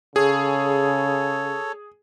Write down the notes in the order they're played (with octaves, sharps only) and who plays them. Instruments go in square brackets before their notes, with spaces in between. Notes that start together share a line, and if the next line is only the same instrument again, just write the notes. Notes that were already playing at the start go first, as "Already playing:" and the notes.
[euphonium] C#3 [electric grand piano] G#4 [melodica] A4 C#5